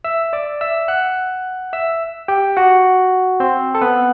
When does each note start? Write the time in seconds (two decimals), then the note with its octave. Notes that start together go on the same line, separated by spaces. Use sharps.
0.05 E5 E6
0.33 D5 D6
0.61 E5 E6
0.88 F#5 F#6
1.73 E5 E6
2.28 G4 G5
2.57 F#4 F#5
3.40 C4 C5
3.75 A4
3.81 B3 B4